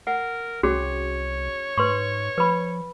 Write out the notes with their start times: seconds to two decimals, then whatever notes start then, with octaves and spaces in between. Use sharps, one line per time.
0.07 A#4 F#5
0.63 C2 C#4 F#4 G#4 C#5
1.78 G#2 B4 C6 C#6
2.38 F3 B4 B5